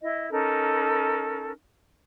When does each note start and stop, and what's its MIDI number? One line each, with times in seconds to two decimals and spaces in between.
0.01 0.27 64
0.01 0.27 75
0.30 1.52 61
0.30 1.52 63
0.30 1.52 69
0.30 1.52 70